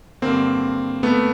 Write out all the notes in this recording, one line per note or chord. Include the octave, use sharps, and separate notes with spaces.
G2 D3 A#3 C4
A3 B3